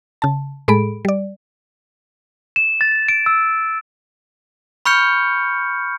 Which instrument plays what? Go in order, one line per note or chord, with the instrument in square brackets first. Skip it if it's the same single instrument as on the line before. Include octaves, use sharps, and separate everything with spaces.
[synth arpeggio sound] C#3 A5
A2 G#3 G#4 A4 B5 D7
G3 D5
[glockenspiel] E7
A6
D7
E6
B5 C#6 F6 G6 C#7